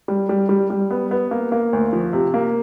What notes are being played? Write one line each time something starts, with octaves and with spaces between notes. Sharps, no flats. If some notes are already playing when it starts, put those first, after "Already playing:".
G3
G3
G3
G3
B3
B3
A#3
A#3
D2
F3
C3
A#3